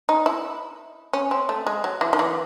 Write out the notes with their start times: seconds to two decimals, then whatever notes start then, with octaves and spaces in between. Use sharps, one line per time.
0.09 D#4
0.26 E4
1.13 C#4
1.31 C4
1.49 A3
1.67 G#3
1.84 F#3
2.01 E3
2.13 D#3
2.19 E3